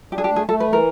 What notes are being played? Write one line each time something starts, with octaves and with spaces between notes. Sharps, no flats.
D4 G4
G#4
G4
A3
G#4
A3 A4
B4
E3
A#4